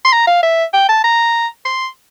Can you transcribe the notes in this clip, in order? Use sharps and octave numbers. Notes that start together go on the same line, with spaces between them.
C6
A#5
F5
E5
G5
A5
A#5
C6